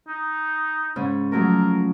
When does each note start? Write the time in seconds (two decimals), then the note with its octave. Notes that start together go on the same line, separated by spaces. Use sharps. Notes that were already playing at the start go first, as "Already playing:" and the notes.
0.08 D#4
0.96 G#2 C#3
1.32 F3 F#3 A3 A#4